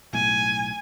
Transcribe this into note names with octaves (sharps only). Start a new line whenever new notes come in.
B1 A2 G#5